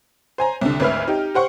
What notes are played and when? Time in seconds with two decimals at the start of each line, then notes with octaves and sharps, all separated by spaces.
0.38 C5 G#5 A#5
0.61 C2 D3
0.80 G#1 D2 B4 E5 F6
1.08 D#4 G4
1.34 G4 C5 F#5 C#6